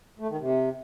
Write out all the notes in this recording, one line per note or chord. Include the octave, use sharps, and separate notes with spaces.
A3
D#3
C3